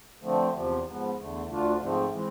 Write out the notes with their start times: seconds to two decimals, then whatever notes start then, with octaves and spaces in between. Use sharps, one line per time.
0.22 D3 F3 A3 C4
0.53 E2 C3 F3
0.85 G#2 F3 B3
1.17 E2 D3 A3
1.48 D2 D3 A3 D4 F4
1.79 G#2 F3 A3 C4
2.11 E3 G#3 C4